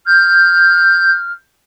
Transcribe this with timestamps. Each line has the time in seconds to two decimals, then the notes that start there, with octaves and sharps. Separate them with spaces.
0.06 F6 G6